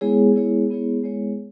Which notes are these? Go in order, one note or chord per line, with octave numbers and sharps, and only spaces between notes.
G#3 B3 E4 G#4 C#5
G#3 B3 E4 G#4 C#5
G#3 B3 E4 G#4 C#5
G#3 B3 E4 G#4 C#5